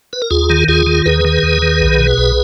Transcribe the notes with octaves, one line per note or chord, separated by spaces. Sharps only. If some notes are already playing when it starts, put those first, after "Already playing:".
B4
A#4
D#2 F4 G#4
D#3
D#2 F4 G#4
D#3
D#2 G#4 B4
D#3
D#2
D#3
B1
B2
B1